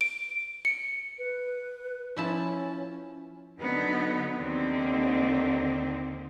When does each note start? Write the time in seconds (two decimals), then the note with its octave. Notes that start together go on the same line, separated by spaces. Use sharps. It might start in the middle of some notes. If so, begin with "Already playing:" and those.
0.01 D7
0.65 C#7
1.19 B4
2.17 F3 C#4 E4 A5
3.59 D3 F#3 B3 D#4
4.36 D#2 D3 D#3 C4